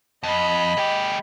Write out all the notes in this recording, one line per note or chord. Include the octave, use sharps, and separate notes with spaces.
F2 D#5 B5
G#3 G4